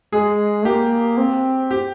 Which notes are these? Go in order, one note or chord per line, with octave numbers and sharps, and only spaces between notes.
G#3 G#4
A#3 G4
C4
G4